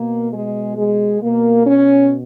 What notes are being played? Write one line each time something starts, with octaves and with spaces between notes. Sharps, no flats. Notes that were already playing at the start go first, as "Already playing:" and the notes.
Already playing: B2 A#3
G#3
G#3
B2 A#3
C#4